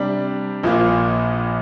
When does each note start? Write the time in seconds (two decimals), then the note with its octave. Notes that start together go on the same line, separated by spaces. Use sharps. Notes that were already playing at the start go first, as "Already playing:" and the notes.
Already playing: C3 G3 D4
0.63 A#1 A#2 F3 A#3